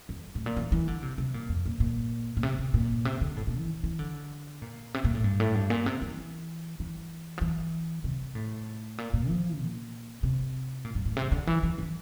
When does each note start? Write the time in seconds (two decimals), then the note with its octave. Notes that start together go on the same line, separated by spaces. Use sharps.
0.09 F2
0.35 A2
0.46 A#2
0.57 E3
0.72 E3
0.88 D3
1.03 C3
1.18 C3
1.34 A#2
1.49 F2
1.66 A#2
1.80 A#2
2.37 A#2
2.43 C3
2.59 C3
2.74 A#2
3.05 C3
3.21 D3
3.37 A2
3.47 A#2
3.58 E3
3.84 E3
3.99 D3
4.62 A#2
4.94 C3
5.04 A#2
5.15 A2
5.24 G2
5.40 A2
5.55 G2
5.70 A#2
5.86 C3
6.02 E3
6.80 E3
7.38 F3
7.41 E3
8.04 C3
8.35 A2
8.98 A#2
9.14 A#2
9.29 F3
9.61 A#2
10.23 C3
10.85 A#2
10.95 G2
11.06 A2
11.17 C3
11.32 D3
11.47 E3
11.63 E3
11.78 E3